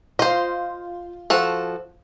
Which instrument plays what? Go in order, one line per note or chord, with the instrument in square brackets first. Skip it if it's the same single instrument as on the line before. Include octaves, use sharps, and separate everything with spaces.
[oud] F4 [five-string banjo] C5 D#5
[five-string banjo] F3 F#4 A4